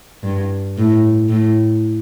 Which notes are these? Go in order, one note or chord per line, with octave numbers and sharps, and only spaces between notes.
G2
A2
A2